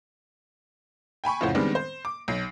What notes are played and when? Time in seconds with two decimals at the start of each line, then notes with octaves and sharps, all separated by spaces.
1.24 G5 G#5 B5 C#6
1.41 F2 A2 C#3 C5 F#5
1.55 D#3 G3 G#3 B3 C4 D4
1.75 C5
2.05 D6
2.28 B1 C7